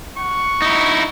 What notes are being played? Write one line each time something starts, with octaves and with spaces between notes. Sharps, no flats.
F#5 C#6
D#4 E4